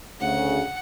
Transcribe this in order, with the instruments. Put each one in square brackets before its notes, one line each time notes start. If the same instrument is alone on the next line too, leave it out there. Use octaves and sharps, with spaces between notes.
[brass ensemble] D2 C#3 [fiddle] F#5